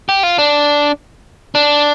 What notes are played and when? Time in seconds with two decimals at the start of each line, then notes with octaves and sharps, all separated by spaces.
0.09 G4
0.23 F4
0.38 D4
1.55 D4